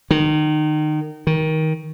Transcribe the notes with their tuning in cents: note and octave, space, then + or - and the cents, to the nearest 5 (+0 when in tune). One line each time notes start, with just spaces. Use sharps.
D#3 -30
D#3 +20